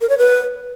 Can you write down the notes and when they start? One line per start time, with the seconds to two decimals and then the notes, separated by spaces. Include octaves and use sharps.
0.01 A#4
0.09 C#5
0.18 B4